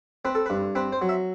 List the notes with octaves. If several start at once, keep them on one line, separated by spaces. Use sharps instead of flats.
C4 B4
A4
G2 B4
C4 B4
C5
F#3
E5